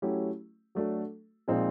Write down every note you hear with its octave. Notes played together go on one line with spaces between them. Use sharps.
F#3 A3 C#4 E4 G4
F#3 A3 D4 F#4 A4
A#2 F3 G#3 C4 D#4